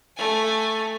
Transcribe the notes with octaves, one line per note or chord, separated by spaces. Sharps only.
A3 G#5